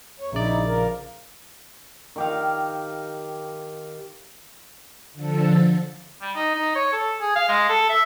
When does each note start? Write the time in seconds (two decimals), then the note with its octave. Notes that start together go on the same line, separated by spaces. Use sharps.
0.20 E2 C#5
0.32 A#1 C#3 D#4 E4 D5
0.66 F3 A#4
2.16 D#3 G4 F5
5.13 D3 F3 A4
6.22 G3
6.35 D#4
6.55 D#4
6.75 C#5
6.93 A4
7.21 G#4
7.36 F5
7.49 G#3
7.69 A4
7.89 E5